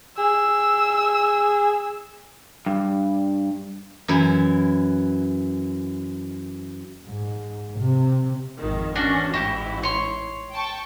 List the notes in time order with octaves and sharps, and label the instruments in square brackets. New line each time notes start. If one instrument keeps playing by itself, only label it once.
[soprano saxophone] G#4 [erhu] E6
[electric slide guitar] G2
[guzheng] F#2 E3 E4
[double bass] G#2
C3
[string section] G#1 F2 D#3
[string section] E2 C#4 [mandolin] A#3 D4 F#4
[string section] A1 G#2 E4 [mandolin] F#4 G4
[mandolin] C#5 C6
[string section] G5 A5 C#6